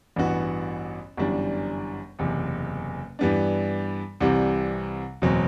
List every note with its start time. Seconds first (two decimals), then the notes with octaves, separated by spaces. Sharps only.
0.16 A1 G2 E3 B3 F#4
1.17 G1 F#2 E3 G3 D4
2.19 F#1 E2 C3
3.19 G2 E3 G3 B3 D4
4.20 C2 C3 E3 G3
5.22 F#1 E2 B2 F#3 C4